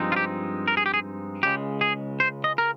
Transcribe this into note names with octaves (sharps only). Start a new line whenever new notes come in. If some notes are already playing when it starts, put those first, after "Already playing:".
Already playing: G2 F3 G#3 C4 D#4
F4
G4
A#4
G#4
G4
G#4
C#2 C#3 G#3 G4
G#4
C5
D#5
A#4